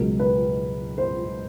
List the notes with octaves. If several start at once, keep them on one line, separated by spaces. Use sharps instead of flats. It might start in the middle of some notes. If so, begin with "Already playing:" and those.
Already playing: C#2 B2 F#3 A#4
B4
C5